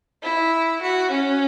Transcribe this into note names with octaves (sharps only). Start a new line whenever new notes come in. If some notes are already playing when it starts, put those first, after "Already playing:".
E4
F#4
C#4